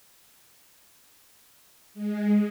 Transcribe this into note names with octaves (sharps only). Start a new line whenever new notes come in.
G#3